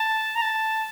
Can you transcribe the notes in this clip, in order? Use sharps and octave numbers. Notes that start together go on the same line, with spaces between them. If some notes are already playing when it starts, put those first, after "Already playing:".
Already playing: A5
A#5
A5